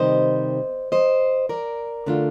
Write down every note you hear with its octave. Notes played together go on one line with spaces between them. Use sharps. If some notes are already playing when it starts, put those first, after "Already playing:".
Already playing: C3 D#3 G3 C5 D#5
C5 D#5
A#4 D5
D3 A3 D4 F4